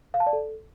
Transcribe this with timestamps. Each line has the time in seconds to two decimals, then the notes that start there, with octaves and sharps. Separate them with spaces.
0.14 F5
0.20 A5
0.27 D5
0.33 A4